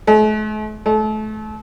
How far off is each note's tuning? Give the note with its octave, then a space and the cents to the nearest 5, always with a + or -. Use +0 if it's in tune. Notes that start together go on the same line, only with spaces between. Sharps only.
A3 -45
A3 -30